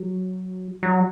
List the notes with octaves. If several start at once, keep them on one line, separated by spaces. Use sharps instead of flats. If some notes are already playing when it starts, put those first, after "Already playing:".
Already playing: F#3
F#3